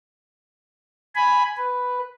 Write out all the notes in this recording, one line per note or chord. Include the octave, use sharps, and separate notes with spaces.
G#5 B5
B4